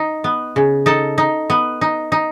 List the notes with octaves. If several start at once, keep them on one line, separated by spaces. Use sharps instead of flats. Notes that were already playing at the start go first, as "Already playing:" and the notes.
Already playing: D#4
B3
C#3
D#4 A4
D#4
B3
D#4
D#4